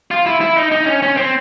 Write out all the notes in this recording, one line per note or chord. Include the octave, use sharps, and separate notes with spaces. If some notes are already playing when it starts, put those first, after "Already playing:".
F4
E4
E4
D#4
D#4
C#4
C#4
C4